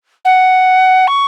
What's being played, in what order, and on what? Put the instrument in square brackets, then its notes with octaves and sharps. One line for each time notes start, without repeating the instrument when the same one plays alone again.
[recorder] F#5
C#6